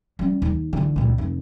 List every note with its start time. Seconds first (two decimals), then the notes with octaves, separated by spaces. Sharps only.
0.19 G3 C#4
0.42 D#2
0.73 D3 E3
0.96 C#2 A#2
1.18 F1